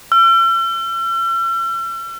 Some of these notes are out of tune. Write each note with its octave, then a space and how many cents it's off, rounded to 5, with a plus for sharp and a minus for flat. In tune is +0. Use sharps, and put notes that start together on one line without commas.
E6 +45